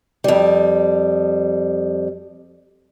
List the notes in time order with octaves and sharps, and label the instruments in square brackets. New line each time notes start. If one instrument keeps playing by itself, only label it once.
[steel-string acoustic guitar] F2 G3